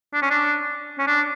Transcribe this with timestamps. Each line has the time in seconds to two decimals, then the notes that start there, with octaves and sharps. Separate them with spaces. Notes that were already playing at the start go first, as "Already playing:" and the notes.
0.14 D4
0.22 C#4
0.30 D4
0.99 C#4
1.07 D4